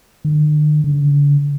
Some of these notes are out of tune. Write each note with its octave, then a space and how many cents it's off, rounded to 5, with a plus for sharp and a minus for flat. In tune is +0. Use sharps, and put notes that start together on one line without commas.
D3 +45
D3 -40